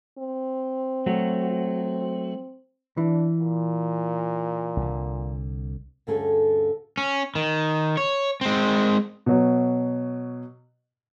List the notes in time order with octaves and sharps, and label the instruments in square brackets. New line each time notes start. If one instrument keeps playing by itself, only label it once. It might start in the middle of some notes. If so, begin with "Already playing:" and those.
[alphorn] C4
[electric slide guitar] F#3 A3 F#4
[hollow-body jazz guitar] E3 [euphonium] D4
[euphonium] A#2
[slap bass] C2 D3
[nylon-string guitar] D2 G2 D3 C#4 G#4 A4
[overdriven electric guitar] C#4
D#3
C#5
G#3 C4
[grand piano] B2 F#3